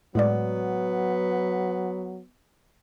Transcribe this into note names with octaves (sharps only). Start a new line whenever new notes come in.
A2 F#3 G#3 B3 D5